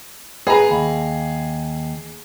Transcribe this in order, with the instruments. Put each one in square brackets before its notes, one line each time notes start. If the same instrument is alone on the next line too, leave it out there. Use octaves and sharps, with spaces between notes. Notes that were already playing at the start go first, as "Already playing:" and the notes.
[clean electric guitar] B3 [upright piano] G#4 A#5
[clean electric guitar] D#2